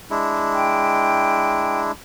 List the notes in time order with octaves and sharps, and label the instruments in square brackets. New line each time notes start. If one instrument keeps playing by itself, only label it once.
[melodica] G#3 D4 E4
[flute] G5